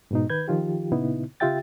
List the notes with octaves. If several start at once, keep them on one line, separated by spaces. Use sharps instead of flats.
G#2 B2 D#4
D#3 B4 G6 G#6
D#3 F3 F4 G4
A#2 C#3 B3 D#4 E4
C#3 F4 G4 E5 G5 A6